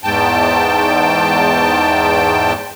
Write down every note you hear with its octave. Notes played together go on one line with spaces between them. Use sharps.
E2 G#2 G5 A5